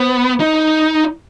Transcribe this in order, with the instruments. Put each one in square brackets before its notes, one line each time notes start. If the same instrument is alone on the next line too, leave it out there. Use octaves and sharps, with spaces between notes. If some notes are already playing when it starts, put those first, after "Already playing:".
Already playing: [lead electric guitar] B3 [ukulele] C5
[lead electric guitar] D#4